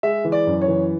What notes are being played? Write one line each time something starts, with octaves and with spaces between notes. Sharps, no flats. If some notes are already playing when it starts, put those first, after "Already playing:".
G#3 E5
E3
D5
F#2
C#5
E3